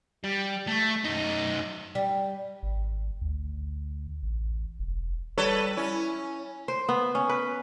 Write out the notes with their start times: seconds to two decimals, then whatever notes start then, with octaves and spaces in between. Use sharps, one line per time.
0.24 G3
0.68 A3
1.05 F#2 D#4
1.95 G3
2.63 G#1
3.21 D2
4.23 A1
4.79 E1
5.38 G3 A4 B4 C#5
5.77 C#4 E4
6.68 C5
6.89 B3
7.15 C#4
7.29 B4